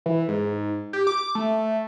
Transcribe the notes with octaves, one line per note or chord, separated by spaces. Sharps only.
E3
G#2
G4
D6
A3